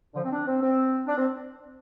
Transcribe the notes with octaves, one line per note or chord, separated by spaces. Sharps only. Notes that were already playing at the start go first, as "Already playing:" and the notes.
D3
F3
C4
D4
C4
C4
D4
C4